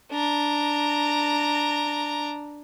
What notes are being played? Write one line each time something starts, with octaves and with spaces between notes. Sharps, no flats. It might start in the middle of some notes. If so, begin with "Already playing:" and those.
D4 A#5